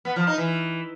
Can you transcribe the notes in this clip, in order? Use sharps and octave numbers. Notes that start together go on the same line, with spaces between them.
B3
F3
D#4
E3